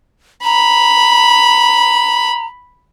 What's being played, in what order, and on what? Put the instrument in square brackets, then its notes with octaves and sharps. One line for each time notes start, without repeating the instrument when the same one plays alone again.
[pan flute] A#5 [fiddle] B5